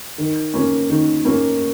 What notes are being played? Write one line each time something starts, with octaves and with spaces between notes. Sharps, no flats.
D#3
A#3 C#4
D#3
A#3 C#4